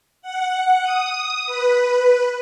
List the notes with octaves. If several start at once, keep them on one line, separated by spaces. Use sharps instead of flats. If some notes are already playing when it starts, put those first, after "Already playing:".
F#5
D#6
B4